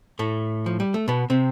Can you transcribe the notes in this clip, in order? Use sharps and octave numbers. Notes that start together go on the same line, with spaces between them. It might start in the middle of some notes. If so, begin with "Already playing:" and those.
A2 A3
F3
G3
A3
B2 B3
C3 C4